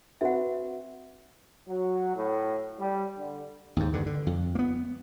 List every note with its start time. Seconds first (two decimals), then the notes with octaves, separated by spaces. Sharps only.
0.21 C4 F#4 B4 E5 F#5
1.68 F#3
2.15 A2
2.79 G3
3.18 D3
3.77 D#2 G#2
3.93 G2 D3
4.06 D3
4.27 F2
4.55 A#3 B3